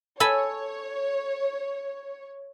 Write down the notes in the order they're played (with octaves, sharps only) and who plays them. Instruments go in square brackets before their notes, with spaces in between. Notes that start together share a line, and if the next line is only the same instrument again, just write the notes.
[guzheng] A4 G#5 B5 [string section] C#5